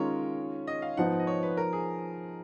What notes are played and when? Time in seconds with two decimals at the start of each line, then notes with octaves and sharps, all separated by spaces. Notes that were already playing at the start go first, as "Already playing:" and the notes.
Already playing: D#3 G#3 C#4 F4 A#4 C#5
0.67 D#5
0.82 F5
0.97 G#2 F3 B3 D#4 F#5
1.20 D#5
1.27 C#5
1.43 B4
1.57 A#4
1.73 G#4